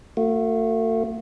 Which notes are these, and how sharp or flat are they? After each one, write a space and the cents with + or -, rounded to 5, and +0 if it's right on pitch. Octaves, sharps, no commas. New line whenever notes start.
A3 +40 F#4 -25